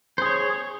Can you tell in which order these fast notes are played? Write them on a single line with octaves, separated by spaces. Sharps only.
C5 G#4 C#5